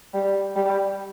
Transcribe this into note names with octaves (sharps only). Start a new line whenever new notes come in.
G3
G3